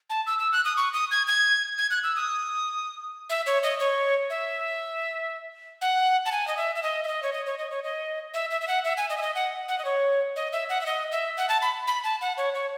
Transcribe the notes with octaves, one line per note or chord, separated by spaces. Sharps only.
A5
E6
E6
F#6
D#6
C#6
D#6
G#6
G#6
G#6
F#6
E6
D#6
E5
C#5
D#5
C#5
E5
F#5
A5
G#5
D#5
E5
E5
D#5
E5
D#5
C#5
D#5
C#5
D#5
C#5
D#5
E5
E5
E5
F#5
E5
G#5
D#5
E5
D#5
F#5
F#5
D#5
C#5
D#5
E5
F#5
E5
D#5
E5
F#5
A5
B5
B5
A5
F#5
C#5
C#5